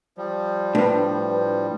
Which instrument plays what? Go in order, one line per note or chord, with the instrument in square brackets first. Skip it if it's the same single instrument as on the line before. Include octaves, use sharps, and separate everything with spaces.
[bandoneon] F3 G3
[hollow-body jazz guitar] A2 [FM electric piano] D4 B4